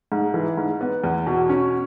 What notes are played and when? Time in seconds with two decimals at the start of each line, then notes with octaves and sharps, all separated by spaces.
0.12 G#2
0.34 E3
0.57 G#2
0.81 B3
1.04 E2
1.27 B2
1.49 C#4